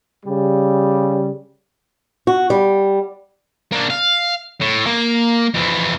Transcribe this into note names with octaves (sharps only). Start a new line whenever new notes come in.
C#3 G3
F#4
G3
A#3 D4
F5
A2
A#3
F2 E3